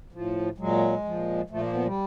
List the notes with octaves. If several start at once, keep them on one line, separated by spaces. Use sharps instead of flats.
A2 F3
A#2 F#3 G#3
A#2 F3
A#2 F3 A3
A#3
B3
G3